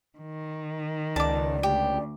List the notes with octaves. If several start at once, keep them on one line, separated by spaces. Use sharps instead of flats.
D#3
C#2 D5 A5 D6
D2 G4